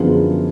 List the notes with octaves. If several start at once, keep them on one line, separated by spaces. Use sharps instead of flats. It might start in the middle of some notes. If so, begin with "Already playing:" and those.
Already playing: F#2 D3 F3 B3 D4 F4 G#4